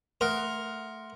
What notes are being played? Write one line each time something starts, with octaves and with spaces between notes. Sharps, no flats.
A3 A#4 F#5 C6